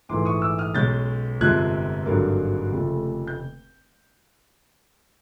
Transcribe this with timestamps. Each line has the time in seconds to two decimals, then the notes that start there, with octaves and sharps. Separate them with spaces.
0.09 A#1 G#2 E3 A3 C6 D6
0.25 C#6 D#6
0.42 D6 E6
0.58 D#6 F6
0.75 B1 B2 G#3 C#4 G6 A6
1.40 G1 F2 C3 F3 G#3 F#6 G#6
2.06 G#1 G2 D3 F#3 A#3
2.72 F1 D#2 C#3 F3 A3
3.27 G6